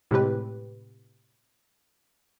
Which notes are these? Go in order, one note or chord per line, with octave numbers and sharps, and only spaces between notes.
A2 C3 G#3 G4 B4